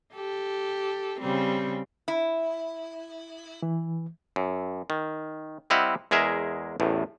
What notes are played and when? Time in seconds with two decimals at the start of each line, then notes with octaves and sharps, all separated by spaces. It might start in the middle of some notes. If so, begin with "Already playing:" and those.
0.15 G4 A4
1.20 C#3 G3 C4
2.08 E4
3.62 E3
4.36 F#2
4.90 D#3
5.70 G3 C4 E4 D#5 F5 F#5
6.11 E2 G#3 G#4 A#4 E5
6.80 A1 E2 A2